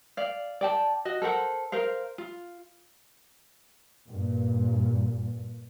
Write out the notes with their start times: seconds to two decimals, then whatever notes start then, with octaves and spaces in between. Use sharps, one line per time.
0.17 D5 F5
0.61 D5 G5 A5
1.05 F#4 D#5
1.22 A4 A#4 C5 F#5
1.72 A#4 C5 F5
2.18 F4
4.07 G2 A#2